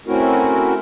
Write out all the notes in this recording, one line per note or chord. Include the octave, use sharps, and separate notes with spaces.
A3 C4 C#4 E4 F#4 A#4